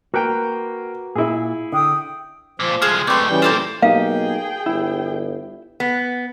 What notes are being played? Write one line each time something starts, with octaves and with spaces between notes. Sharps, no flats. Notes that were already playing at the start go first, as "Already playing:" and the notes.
A#3 F#4 B4 G5 A#5
A#2 E4 G#4
D3 G5 D#6
C#2 A#2 F3
C2 G#3 G#4 C5 F6
G#2 A3 C4 B4 D5 C6
C#3 E3 G3 G5
A#3 C4 F4 A4 C5
B1 A#3 D#4 G4 G#4 F5 G5
G1 E4
B3